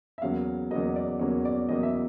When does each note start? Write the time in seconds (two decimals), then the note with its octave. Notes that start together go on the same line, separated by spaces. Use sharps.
0.18 E5
0.22 E2 C#3 F#3 A#3 F5
0.71 E2 C#3 F#3 A#3 D#5
0.96 D5
1.20 E2 C#3 F#3 A#3 C#5
1.45 D5
1.69 E2 C#3 F#3 A#3 D#5
1.83 E5